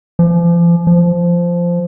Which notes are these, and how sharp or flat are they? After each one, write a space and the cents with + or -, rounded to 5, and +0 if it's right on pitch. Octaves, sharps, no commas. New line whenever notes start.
F3 -35
F3 -10